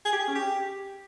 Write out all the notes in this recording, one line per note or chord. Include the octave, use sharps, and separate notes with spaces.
G#4
G4
G#4
C#4
G4